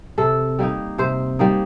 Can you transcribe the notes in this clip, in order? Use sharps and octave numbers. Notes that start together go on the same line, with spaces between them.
C3 A4
G3 A#3 D#4
C3 C5
G3 A#3 D#4